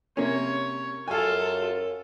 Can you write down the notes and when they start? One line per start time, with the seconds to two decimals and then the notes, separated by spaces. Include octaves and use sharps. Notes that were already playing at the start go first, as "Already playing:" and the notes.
0.17 C3 A#3 C#4 C#5
1.08 F#2 F4 A4 F5 G#5